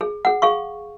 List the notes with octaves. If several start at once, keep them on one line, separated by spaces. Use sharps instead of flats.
G#4
G#4 F#5
G#4 F5 C#6